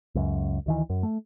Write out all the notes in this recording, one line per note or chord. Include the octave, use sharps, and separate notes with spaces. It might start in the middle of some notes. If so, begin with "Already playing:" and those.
C#2 F#2
D2 D#3 E3
F#2
A3